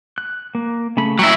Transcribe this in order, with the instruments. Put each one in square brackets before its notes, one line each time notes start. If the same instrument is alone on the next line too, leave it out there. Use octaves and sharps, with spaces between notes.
[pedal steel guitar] F#6
A#3
C#3 A3 B5
[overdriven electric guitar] F#3 E4 [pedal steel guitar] G5 E6